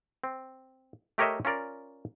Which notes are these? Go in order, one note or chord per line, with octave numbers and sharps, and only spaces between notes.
C4
A3 G4 A#4 C#5 D#5 E5
C#4 F4 A#4 D5